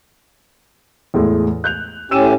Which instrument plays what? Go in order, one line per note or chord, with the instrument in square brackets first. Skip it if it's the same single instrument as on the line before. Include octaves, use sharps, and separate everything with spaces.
[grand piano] E2 A2 G#3
F#6 G6 F7
[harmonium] A2 C#4 G4 [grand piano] E6 D#7 E7